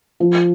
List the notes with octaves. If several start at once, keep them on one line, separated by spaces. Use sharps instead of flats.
F3